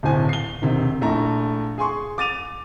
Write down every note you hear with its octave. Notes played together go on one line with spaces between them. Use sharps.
D1 B1 A2 C5 G#5
C7 G7
E1 C3 D#3
A#1 A3 E4 A#5
G#4 G#5 C6 C#6
D6 A6 D#7 F7